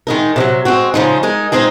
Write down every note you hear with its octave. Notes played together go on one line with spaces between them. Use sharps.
D#3 G#3 D#4 A#4
C3 D#3 F#3
G#3 C4 F#4
C#3 F3 G#3 D#4
G#3 D#4 A#4
A#2 G#3 C4 D#4 G#4